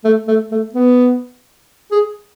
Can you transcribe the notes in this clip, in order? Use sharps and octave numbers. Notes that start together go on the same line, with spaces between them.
A3
A3
A3
B3
G#4